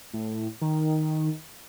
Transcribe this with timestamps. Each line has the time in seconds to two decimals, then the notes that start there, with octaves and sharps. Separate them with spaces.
0.13 A2
0.61 D#3